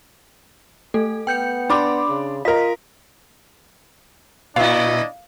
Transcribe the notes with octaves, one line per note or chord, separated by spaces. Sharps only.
A3 A4
B3 G5 G6 C#7
D4 B5 C6 D6
C#3
F4 A#4 D#5 B6
A#2 D4 E4 D#5 F5